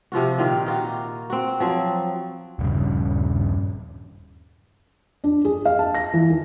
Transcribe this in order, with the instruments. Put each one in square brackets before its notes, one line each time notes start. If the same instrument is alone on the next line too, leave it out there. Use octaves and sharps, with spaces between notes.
[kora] C3 F3 F4 F#4
A#2 D#3 F4 G4
D#4 F4 F#4
C4 F#4
F3 F#3 C4
[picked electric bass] D#1 G2 C#3
[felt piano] D4
G#4
F5
A5
A#6
E3
D#3